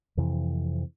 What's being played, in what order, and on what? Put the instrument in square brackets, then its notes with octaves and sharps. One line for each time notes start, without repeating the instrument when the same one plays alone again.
[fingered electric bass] F2 C3 E3